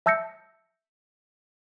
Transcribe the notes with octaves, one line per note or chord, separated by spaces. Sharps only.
E5 A5 E6 G6 A#6 C#7